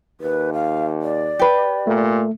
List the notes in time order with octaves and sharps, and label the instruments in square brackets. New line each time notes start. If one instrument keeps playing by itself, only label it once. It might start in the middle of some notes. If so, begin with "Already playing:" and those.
[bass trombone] D#2 [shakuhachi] B4
[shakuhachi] F5
D5
[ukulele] G4 B4
[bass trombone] A#2 [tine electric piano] A3